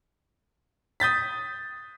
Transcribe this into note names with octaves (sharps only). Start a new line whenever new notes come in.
D#6 G6 A6 B6